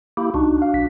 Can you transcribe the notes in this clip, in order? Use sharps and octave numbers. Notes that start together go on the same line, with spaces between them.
A#3 E4 G4
C2 D4 D#4 F#4
F5
A#1 B6